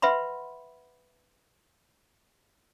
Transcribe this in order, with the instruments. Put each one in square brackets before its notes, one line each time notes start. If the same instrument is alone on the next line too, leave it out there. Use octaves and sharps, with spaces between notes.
[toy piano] B4 E5 F#5 B5 C6